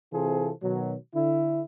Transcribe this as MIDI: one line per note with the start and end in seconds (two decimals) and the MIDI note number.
0.13 0.51 48
0.13 0.51 52
0.13 0.51 60
0.13 0.51 65
0.13 0.51 68
0.13 0.51 69
0.63 0.95 47
0.63 0.95 51
0.63 0.95 54
1.15 1.62 50
1.15 1.62 64